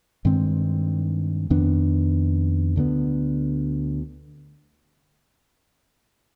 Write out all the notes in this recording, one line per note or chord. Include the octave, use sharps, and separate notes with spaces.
G2 D#3 G#3 C4
F2 D#3 B3 D4
D2 D3 G3 B3